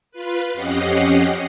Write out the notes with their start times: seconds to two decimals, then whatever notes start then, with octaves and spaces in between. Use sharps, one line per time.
0.12 F4 B4
0.54 F2 C#4 G4 D#5 F#5 C7